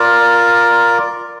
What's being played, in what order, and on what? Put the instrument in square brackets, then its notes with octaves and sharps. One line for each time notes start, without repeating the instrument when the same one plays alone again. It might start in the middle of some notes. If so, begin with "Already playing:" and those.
Already playing: [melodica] F4 A#4 D5